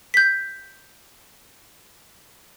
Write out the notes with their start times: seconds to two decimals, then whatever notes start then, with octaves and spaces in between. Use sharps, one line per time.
0.14 G6 B6